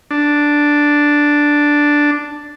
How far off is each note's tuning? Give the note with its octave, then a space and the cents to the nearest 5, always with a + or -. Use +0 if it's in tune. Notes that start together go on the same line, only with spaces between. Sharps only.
D4 +0